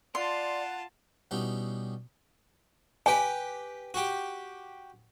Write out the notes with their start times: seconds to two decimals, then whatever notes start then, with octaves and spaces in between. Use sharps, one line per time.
0.15 F4 D5 F#5 A5 C6
1.31 B2 G3 C#4 D#4 E4 G4
3.06 G4 B4 G#5
3.94 F#4 G4